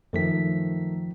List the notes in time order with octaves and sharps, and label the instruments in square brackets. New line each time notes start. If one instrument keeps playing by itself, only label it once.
[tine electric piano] F#2 F3 B6 [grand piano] D#3 A3